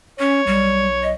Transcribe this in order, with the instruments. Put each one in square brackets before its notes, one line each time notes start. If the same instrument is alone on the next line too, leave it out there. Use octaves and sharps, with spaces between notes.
[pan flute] C#4 [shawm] C#5
[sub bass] B1 [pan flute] G3
[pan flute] D#5